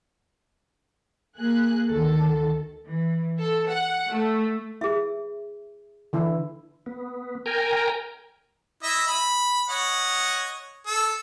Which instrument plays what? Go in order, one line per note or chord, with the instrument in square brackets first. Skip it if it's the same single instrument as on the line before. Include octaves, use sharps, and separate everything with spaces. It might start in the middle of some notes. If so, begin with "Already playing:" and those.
[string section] A#3 G#4 F#6
D2 D#3 A4
E3
A4
F#5
A3
[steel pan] E4 [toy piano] G#4 E5
[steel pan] D3 E3 E4
[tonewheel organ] B3
A#4 G5 G#5 A#5
[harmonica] E4 D#5 E5
B5
C#5 D#5 F#5
A4